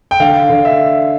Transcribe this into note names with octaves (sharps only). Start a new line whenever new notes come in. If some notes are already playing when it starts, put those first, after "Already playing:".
G5
D3 F5
D3
E5